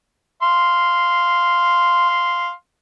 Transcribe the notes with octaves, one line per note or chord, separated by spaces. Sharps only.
F5 C6